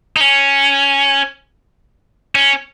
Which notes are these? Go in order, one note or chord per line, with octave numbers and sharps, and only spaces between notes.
D#4
C#4
C#4